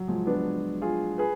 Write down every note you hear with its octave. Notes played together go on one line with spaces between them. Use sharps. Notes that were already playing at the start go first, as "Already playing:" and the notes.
Already playing: F#3
F3 G#3
B3 D4
F4 G#4
G#4 B4